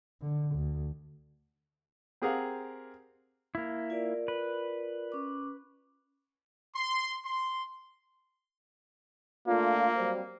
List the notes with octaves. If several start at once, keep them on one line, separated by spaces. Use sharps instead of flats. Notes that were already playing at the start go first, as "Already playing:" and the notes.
D3
D2
C4 G4 G#4 A#4 F5 F#5
A#3 E4
F4 A#4 D5
B4
C#4 D6
C6
C6
A3 A#3 D4 F4
F#3 G3 C4